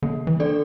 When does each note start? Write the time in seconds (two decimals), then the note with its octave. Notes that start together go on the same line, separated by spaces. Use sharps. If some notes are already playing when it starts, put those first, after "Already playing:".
0.02 D3 A#3
0.27 E3
0.40 D4 A4 D5